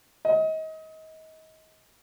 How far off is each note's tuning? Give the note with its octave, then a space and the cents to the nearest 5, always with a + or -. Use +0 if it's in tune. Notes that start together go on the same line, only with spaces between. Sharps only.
D#5 +30